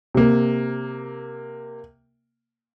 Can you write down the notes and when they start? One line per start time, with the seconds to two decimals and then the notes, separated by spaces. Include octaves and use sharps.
0.15 C3 A#3